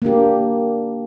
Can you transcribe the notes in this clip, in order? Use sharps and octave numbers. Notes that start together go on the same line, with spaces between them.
A#3 D4 G4